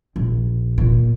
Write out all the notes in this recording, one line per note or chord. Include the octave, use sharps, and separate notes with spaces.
A#1
A#2